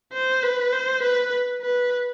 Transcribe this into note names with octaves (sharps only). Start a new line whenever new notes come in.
C5
B4
C5
B4
B4